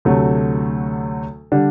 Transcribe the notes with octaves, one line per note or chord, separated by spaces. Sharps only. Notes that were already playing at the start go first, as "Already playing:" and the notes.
D2 C3 F#3 A3
D3 G3 D4